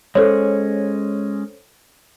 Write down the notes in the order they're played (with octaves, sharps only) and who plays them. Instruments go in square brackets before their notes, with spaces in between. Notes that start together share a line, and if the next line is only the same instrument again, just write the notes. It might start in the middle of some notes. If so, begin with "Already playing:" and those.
[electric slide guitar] G#3 C#4 [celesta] A4 C5 C#5